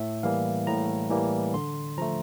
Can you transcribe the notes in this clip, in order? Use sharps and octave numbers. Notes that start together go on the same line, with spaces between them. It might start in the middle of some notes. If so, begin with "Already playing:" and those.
Already playing: A2 E5
E3 G3 A#3 F5
A2 A#5
E3 G3 A#3
D3 C6
F3 A3 A#5